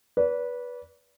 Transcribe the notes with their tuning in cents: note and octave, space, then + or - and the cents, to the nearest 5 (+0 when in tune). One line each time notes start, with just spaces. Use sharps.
B4 -15 D5 -35